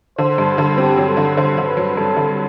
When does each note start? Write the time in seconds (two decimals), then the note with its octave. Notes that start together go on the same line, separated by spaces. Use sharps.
0.18 D3 C5
0.38 G2
0.58 D3
0.78 C4 G4
0.97 F#3
1.08 A4
1.17 D3
1.37 D3 C5
1.58 D3
1.67 B4
1.77 F#3
1.97 G2 A4
2.17 D3